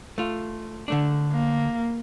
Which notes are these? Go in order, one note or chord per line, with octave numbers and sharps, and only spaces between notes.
A3 F4
D3 A3 D4
A#3